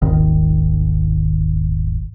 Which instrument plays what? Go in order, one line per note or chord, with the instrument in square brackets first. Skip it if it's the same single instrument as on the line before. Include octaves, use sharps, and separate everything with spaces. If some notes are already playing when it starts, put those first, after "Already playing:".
[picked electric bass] D#1 G#1 D#3